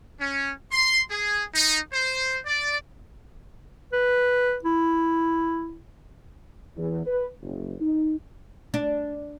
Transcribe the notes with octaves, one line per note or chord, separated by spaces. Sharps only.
C#4
C6
G#4
D#4
C5
D5
B4
E4
E2
B4
F#1
D#4
D4